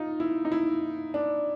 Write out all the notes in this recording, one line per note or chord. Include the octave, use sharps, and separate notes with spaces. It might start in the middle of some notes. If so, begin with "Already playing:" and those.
Already playing: D#4 F4
E4
D#4
E4
D4